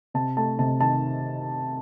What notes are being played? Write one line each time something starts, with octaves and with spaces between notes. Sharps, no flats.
C3 A5
A3 A5
C3 A5
D#3 A5